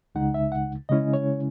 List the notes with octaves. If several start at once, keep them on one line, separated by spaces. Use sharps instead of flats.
C#2 C#3 G#3 D#4 F#5
E5
F#5
C#3 G#3 C#4 E4 D#5
C#5